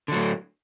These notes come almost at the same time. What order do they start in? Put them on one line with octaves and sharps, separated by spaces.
D3 F#3 A2